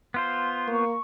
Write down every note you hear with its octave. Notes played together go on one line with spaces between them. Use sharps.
B3 F4 C5 C6
A#3 C#6